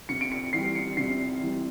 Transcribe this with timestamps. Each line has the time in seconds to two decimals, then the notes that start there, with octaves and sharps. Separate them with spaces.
0.09 C3 C#7
0.21 D7
0.32 C#7
0.53 E3 G3 C7
0.75 C#7
0.97 C3 C7
1.41 E3 G3